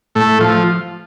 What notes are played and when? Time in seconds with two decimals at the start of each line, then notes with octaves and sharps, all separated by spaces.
0.15 A2 A3
0.40 F3